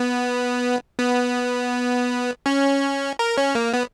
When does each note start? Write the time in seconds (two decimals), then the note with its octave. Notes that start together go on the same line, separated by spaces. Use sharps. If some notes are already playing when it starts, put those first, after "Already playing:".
Already playing: B3
0.99 B3
2.46 C#4
3.19 A#4
3.38 C#4
3.55 A#3
3.74 B3